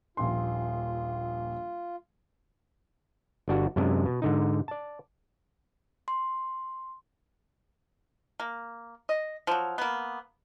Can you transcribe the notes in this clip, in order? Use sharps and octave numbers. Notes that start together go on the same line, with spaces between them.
D#1 A#1 F4 C6
G1 D4 F#4
F#2 C3 G#3 D4
B2
G#2 D3 D#4
D5 A5
C6
A#3
D#5
F3 F#3
A#3 B3